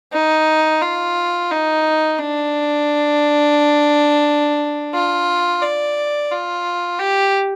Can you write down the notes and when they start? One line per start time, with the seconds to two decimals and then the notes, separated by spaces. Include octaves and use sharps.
0.13 D#4
0.82 F4
1.51 D#4
2.20 D4
4.94 F4
5.62 D5
6.32 F4
6.99 G4